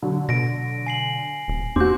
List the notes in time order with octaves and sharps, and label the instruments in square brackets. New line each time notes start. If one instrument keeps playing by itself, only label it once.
[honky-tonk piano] D3 F#3
[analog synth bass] B2 [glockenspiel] A#6 D7
[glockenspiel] G#5 C7 F#7
[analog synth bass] D#1
[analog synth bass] E2 [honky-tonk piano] C4 F#4 [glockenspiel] D6 G6